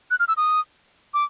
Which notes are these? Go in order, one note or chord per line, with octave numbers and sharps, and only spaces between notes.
F#6
F6
E6
D#6
D6